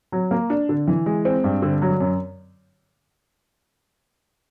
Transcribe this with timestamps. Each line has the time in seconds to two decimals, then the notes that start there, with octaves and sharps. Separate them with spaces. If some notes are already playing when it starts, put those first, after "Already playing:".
0.12 F#3
0.31 A#3
0.50 D4
0.69 D3
0.88 E3
1.06 G#3
1.25 C4
1.44 G2
1.62 D3
1.82 F#3
2.00 F#2